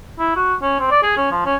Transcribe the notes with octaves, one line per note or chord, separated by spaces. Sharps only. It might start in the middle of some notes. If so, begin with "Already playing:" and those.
E4
F#4
C#4
C4
D5
G#4
C#4
F3
C#4